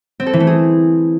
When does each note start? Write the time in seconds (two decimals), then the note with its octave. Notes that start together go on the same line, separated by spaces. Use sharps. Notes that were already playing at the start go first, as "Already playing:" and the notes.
0.20 C4
0.27 A4
0.33 E3
0.40 A3
0.47 G#4